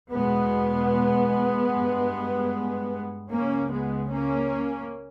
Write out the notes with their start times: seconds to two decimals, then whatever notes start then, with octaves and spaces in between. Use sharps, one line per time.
0.11 E2 B2 G#3 B3
1.72 G2
3.31 C#2 C#3 A#3 C#4
3.71 G#3 B3
4.11 A#3 C#4